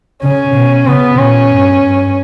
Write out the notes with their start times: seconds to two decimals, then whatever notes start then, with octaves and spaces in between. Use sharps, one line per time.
0.23 C#3 C#4
0.55 B2
0.87 C#3 B3
1.18 A#2 C#4
1.50 G2
1.82 G2